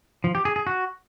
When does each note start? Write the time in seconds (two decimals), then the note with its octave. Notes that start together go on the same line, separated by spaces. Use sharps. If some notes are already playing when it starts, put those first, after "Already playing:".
0.24 F3
0.35 G4
0.45 G#4
0.56 G#4
0.67 F#4